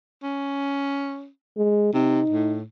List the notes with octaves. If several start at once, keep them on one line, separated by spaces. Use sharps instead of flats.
C#4
G#3
C3 D#4
A2